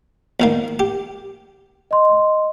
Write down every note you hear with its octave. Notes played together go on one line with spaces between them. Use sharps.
E2 D#3 A#3
G4
D#5 C6